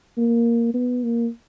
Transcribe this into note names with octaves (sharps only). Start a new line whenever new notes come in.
A#3
B3
A#3